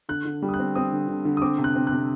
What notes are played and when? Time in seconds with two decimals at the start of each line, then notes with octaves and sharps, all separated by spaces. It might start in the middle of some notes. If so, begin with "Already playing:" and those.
0.09 D3 F#6
0.25 D3
0.42 G3
0.49 D#6
0.54 F#6
0.59 C4
0.75 C4 D#6
0.92 D3
1.08 D3
1.25 D3
1.37 D#6
1.42 C4 D6
1.58 C3
1.64 F#6
1.75 C4
1.87 C3 F#6